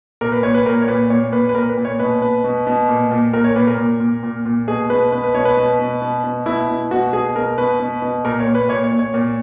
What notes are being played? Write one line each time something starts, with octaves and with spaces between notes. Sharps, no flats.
A#2 A#4
B4
A#2 C#5
B4
A#2 A#4
C#5
A#2 B4
A#2 C#5
A#2 B4
B4
A#2 A#4
B4
A#2
C#5
B2 B4
B2 B4
B2
B2
A#2
A#2
A#2 A#4
C#5
A#2 B4
A#4
A#2
A#2
A#2
A#2
B2 G#4
B2 B4
B2 B4
B4
B2 C#5
B4
B2
B2
B2
B2
B2 E4
B2
B2 F#4
B2 G#4
B2 A#4
B2 B4
B2
B2
A#2 A#4
C#5
A#2
B4
A#2 C#5
C#5
A#2
C#5
A#2